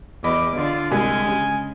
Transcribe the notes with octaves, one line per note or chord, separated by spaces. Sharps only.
E2 D#5 B5 D6
D3 F4 D5
C2 G#3 G#5
C#3